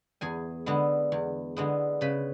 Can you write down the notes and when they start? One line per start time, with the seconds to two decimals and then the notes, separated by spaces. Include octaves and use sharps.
0.21 E2 G#4 G#5
0.66 D3 G#3 B3
1.12 E2
1.56 D3 G#3 B3
2.01 C#3 B4 B5